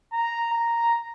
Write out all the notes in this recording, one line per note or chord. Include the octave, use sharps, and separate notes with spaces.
A#5
A#5